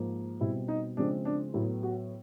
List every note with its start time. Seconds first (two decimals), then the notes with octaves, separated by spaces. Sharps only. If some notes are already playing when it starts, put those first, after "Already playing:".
Already playing: G#2 F3 A#3
0.40 B2 G3 C4 E4
0.68 D#4
0.97 C#3 F3 G#3 C4 D4
1.25 D4
1.54 A2 F#3 B3 E4
1.83 F#4